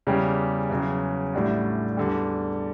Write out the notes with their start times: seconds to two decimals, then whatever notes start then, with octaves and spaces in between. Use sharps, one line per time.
0.07 E2 C#3 G3 C#4 G4
0.70 E2 C#3 F#3
1.33 A1 A2 G3 D4 F#4
1.97 E2 D3 G3